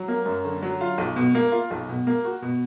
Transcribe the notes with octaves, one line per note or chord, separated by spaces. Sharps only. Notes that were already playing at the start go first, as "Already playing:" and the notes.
Already playing: F#3
A#3
F#2
D3
F#3
F4
B1
B2
A#3
F4
B1
B2
A#3
F#4
B2